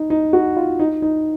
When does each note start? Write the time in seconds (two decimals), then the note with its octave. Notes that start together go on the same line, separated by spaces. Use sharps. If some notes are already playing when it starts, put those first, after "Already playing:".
Already playing: D#4
0.10 D#4
0.33 F#4
0.57 F4
0.79 D#4
1.02 D#4